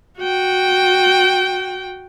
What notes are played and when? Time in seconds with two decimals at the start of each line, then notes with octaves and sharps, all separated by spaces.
0.19 F#4 G5